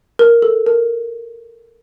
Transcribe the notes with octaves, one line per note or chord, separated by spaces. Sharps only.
A#4
A4
A#4